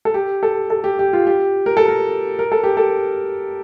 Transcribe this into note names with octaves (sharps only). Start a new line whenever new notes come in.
A4
G4
A4
A4
G4
G4
F4
G4
A#4
A4
A#4
A#4
A4
G4
A4